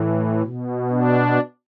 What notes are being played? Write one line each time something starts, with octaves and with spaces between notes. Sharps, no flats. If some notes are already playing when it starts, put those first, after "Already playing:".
Already playing: A2 E3
B2
D4